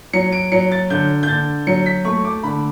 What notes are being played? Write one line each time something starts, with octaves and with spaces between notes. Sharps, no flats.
F#3 C#7
D7
F#3 C#7
A6
D3 G6
G6
D3 A6
F#3 C#7
B6
A3 C#6
D6
D3 B5